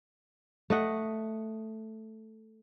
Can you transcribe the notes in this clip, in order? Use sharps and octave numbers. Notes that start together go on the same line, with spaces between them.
A3 D#5 F#5